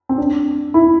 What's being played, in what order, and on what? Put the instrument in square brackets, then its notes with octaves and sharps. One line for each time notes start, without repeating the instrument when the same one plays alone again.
[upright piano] C4
D4
E4